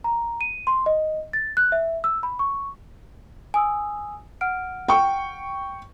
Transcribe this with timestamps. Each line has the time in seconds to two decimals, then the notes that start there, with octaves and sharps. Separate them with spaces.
0.04 A#5
0.41 D#7
0.67 C6
0.86 D#5
1.33 A6
1.57 F#6
1.72 E5
2.04 E6
2.23 B5
2.39 C#6
3.54 G#5 D#6 E6
4.41 F#5 F6 D7
4.88 G5 C#6